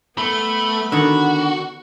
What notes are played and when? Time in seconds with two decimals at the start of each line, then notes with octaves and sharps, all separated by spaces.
0.18 A3 B3 B5
0.92 D3 D#3 F#4